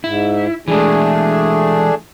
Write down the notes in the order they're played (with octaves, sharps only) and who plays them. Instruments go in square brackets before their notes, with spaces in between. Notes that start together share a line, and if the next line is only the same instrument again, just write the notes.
[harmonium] G#2 [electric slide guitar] E4
[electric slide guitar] E3 G#3 [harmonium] A3 D4 G#4